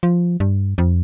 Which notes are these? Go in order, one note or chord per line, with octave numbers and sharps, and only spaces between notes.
F3
G2
F2